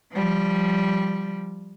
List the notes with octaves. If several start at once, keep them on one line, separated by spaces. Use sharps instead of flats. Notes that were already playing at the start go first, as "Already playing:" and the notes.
F3 G3